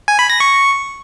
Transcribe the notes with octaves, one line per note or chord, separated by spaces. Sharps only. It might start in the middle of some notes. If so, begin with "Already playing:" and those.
G#5
B5
A#6
C#6